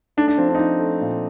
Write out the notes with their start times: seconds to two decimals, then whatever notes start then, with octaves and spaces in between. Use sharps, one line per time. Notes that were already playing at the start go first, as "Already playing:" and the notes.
0.17 A3 D4
0.28 D4
0.38 F3 C4
0.49 D4
0.55 D#4
0.59 F3 D4
0.80 A3
1.01 A#2